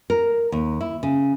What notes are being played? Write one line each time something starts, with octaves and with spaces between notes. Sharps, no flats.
A#4
D#2
E4
C#3